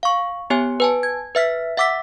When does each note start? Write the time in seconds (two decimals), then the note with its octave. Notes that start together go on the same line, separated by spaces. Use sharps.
0.03 F5 C#6
0.50 B3 G4 C#5 G#5
0.80 B4 G#5 A5
1.03 G#6
1.35 B4 E5 F6 B6
1.77 E5 F#5 D6 E6 B6